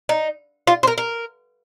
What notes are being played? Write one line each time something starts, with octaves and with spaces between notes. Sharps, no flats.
D#4
F4
C5
A#4
A#4